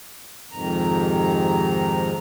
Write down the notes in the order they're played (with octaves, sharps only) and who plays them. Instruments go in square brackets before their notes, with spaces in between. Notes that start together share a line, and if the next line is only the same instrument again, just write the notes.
[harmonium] F2 G#2 C3 D#3 A#5